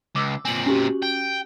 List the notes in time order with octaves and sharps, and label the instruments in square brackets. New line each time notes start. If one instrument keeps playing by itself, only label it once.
[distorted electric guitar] C#2 [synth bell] D6 E6
[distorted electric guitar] A#2 C4 [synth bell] G#5 F#7
[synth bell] C#4 F#4 G4
[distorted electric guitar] G5